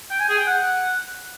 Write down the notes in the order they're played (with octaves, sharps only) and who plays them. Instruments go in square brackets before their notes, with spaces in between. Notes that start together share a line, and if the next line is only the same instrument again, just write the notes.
[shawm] G5
G#5
G#4
G5
F#5